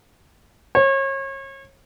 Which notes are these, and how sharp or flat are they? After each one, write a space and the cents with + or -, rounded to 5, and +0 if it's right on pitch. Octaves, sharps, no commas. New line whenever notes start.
C#5 -35